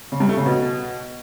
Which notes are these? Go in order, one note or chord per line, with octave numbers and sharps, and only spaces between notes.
C#3
G2
A3
C#3
B2